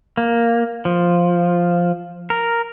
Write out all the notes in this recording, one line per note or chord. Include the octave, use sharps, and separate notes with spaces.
A#3
F3
A#4